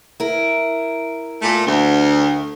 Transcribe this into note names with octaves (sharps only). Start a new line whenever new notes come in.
E4 A#4
A#2 A3
D2